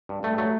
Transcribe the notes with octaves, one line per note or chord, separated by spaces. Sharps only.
G2
G2 A3
F#3 A3